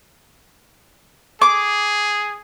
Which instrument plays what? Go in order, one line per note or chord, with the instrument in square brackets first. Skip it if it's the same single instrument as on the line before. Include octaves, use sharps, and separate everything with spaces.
[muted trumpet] G#4 [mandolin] D6